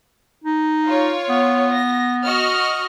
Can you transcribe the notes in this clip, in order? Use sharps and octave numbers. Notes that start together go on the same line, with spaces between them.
D#4
F4 C#5
B3
A#6
F#4 D#5 F6